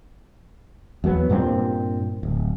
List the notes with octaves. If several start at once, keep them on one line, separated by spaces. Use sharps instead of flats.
E2 F#3 G#3 B3
G2 A#2 A#3 C4
D1